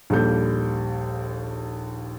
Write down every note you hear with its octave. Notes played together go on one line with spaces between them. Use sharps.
A#1 D#2 G3 A4 G6